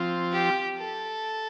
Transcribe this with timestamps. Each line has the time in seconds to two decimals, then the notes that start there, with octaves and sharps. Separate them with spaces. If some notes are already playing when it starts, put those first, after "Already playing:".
Already playing: F3 C4 F4
0.32 G4
0.77 A4